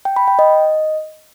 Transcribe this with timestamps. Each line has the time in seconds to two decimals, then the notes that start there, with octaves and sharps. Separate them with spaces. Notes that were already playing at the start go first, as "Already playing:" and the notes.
0.05 G5
0.16 B5
0.28 G5
0.39 D#5